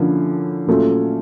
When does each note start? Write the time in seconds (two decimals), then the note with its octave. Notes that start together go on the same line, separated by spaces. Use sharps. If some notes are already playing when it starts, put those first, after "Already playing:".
Already playing: D3 F3 A#3 C#4 E4
0.67 A#2 F#3 A3 C#4 F4